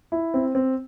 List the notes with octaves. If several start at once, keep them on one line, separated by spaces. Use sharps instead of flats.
E4
C4
C4